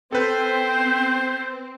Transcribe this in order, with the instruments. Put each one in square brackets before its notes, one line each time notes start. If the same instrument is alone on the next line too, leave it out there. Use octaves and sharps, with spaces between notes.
[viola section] C4 [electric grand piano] A4 B4 [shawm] C5 [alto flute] G5